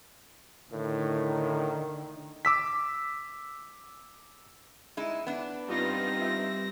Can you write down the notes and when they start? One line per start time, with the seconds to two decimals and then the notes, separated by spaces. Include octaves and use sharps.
0.72 A2 D3 D#3
2.45 D6 E6 B6
4.97 G#3 D#4 E4
5.27 B3 D4
5.68 G2 C4 D#4 F4 A#6
6.21 E5